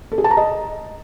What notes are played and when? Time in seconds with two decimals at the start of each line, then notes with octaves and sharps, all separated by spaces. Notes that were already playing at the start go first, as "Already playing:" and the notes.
0.12 A4
0.18 G#4
0.24 A5
0.31 A#5
0.37 D#5